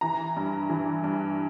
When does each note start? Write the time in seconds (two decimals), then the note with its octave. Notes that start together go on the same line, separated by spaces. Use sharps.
0.01 E3 A#5
0.36 G2
0.70 E3
1.04 G2